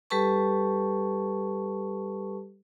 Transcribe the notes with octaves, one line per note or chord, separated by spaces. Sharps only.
G3 G4 A4 B4 A5 C#6